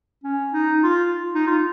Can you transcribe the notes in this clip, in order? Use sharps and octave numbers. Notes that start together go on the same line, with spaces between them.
C#4
D#4
F4
D#4
F4